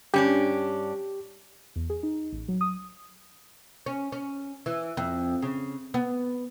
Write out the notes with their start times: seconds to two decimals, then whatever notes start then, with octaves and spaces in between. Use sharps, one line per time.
0.14 G2 C#4 D4 G4
1.76 E2
1.90 G#4
2.03 D#4
2.32 A1
2.48 F#3
2.61 D#6
3.86 C#4
4.12 C#4
4.66 E3
4.97 F2
5.42 C#3
5.94 B3